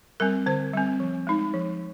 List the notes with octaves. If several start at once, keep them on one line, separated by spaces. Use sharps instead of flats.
G3 C4 A#4
D3 C5
G3 C4
F3
G#3 D#4
F3